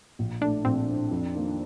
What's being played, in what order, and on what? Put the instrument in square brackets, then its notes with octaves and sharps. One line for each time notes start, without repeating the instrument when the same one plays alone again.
[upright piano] A#1
[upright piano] A2 A3 [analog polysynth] D4
[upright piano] A#1 [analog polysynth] C4
[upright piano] A2 A3
F2
D#3 A#3 F4